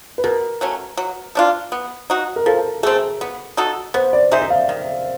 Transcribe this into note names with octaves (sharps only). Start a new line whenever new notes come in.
B4
B2 A#4
F#3 A3 C#4
F#3
A3 D4 F4
B3
D#4 F#4
A#4
F3 A4
A3 C4 G#4
B3
D#4 F#4 A4
B3 C5
D5
D#4 G#4 C5 E5
E5
F5
D#3